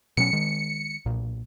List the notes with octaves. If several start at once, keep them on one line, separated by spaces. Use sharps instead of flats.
B2 F#3 C#4 C#7
D#3 G#3
B1 A#2